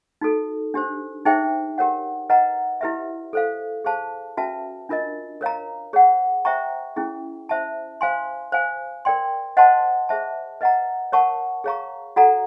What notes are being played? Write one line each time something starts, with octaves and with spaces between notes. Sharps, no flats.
D#4 F#4 A4
D4 G4 C5
D#4 G#4 C5 E5 G5
G4 A#4 C#5 F#5
B4 D#5 F#5 A#5
E4 G4 B4 E5
A4 C5 F5
G#4 C5 F5 A5
C#4 F#4 B4 E5 A5
D4 F4 A#4 D#5
A#4 C#5 F5 A#5
G#4 C#5 F#5
C5 E5 G5 A#5 C#6
C#4 E4 G#4
C5 E5 A5
C5 F5 G#5 C6
C5 F5 G#5
A#4 D5 G5 C6
C5 D#5 F#5 A5 C6
G#4 C5 E5 A5
B4 D#5 F#5 A#5
A#4 C#5 F#5 A5 C#6
G#4 C#5 F5 A#5 C#6
F#4 A4 D5 F#5 A#5